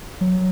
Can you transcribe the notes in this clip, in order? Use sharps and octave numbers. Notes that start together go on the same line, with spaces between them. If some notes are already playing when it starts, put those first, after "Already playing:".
F#3